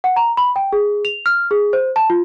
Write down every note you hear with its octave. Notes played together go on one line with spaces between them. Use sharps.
F#5
A#5
B5
G5
G#4
F7
F6
G#4
C5
A5
F4